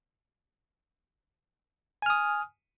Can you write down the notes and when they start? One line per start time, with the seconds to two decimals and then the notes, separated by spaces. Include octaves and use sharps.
2.02 G#5
2.06 F6
2.10 D#6